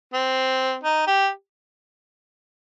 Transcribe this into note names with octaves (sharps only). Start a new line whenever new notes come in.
C4
D#4
G4